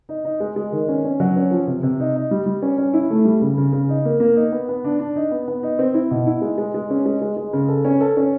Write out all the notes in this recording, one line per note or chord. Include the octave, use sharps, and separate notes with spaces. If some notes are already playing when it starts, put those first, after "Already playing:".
D#4
D#4
G#3
G#3
D#3
C#4
C#4
F#3
C#4
F3
C3
C3
D#4
D#4
G3
G3
C#4
C#4
E4
A3
G3
C#3
C#3
C#3
D#4
A#3
A#3
D#4
B3
B3
D4
D4
D#4
B3
B3
D#4
C4
E4
B2
E4
G#3
G#3
G#3
C#4
G#3
G#3
G#3
C#3
A4
C#4
A4
C#4